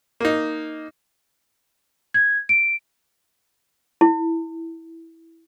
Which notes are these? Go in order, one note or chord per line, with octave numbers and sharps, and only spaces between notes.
A#3 D#4
G#6
D7
E4